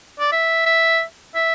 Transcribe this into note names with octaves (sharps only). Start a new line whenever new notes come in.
D5
E5
E5
E5